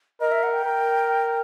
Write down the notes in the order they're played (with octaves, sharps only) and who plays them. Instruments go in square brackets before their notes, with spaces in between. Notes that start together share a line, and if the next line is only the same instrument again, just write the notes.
[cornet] A#4 [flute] D#5
[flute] E5
F#5
G5
[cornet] A#4